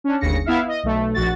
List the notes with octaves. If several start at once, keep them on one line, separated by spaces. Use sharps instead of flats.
C#4 D4
G1 D#2 C#3 A#6 C#7
B3 E4 E5 F5
D#5
B1 A3
A#1 F#4 A6